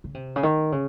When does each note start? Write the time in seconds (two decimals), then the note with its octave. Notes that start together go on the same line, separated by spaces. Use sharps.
0.04 C#3
0.14 C3
0.36 C#3
0.43 D#3
0.72 C#3